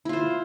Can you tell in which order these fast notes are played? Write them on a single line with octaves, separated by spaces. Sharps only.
E4 F4 C5